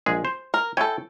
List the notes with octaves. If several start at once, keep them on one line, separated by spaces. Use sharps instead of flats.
A#1 G#3 G#4
C5
A#4
E4 A4 C#5 G5 G#5